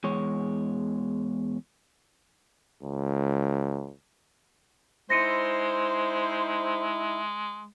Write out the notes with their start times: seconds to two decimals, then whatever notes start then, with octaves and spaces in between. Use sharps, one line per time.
0.04 E2 G#3 C#5
2.83 C#2
5.10 G#3 D#4 E4 C5 A#6 C#7 D#7